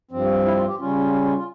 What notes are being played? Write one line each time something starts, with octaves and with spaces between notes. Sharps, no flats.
G2 F3 C4
E4
F4
G4
C#3 G3 C#4 F4
F4
F4
F4
F4